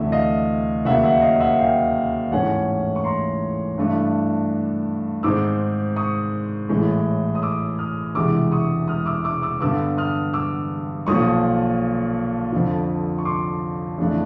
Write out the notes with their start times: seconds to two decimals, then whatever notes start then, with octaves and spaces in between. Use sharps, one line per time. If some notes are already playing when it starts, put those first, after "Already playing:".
Already playing: D2 C3 E3 A3 D5 E5
0.12 D#5 F5
0.85 D#2 C#3 F#3 A#3 E5 F#5
1.04 E5 F#5
1.22 D#5 F5
1.40 E5 F#5
1.59 F5 G5
2.31 A1 G#2 E3 A3 C#4 F#5 G#5
2.96 C#6
3.04 A#5 C6
3.78 G2 E3 A3 D4
5.23 G#2 D#3 G#3 C4 D#4 D6 E6
5.96 C#6 D#6
6.69 A1 A2 E3 G#3
7.35 D#6
7.42 D6 E6
7.79 D#6 F6
8.15 E1 E2 C3 E3 G#3 D6 E6
8.52 C#6 D#6
8.88 D#6 F6
9.06 D6 E6
9.24 D6 E6
9.42 D6 E6
9.61 G2 D3 G3 B3 D6 E6
9.97 D#6 F6
10.34 D6 E6
11.07 B1 A#2 F3 C#6 D#6
12.52 F2 D3 F3
13.18 C#6
13.25 C6 D6
13.98 F2 C#3 E3 A3 D4